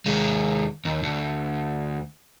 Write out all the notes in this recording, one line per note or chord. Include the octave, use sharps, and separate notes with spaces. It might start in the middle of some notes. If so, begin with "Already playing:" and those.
D#2 G#3
D#2
D2